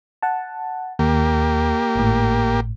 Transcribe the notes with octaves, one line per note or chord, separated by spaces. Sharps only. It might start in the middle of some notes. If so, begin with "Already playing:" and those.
F#5 A5
D#2 A#3 G4
G#1 A2